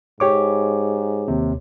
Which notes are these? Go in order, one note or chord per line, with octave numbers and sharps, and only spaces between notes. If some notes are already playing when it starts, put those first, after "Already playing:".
G#2 G4 C#5 D6
D#2 C3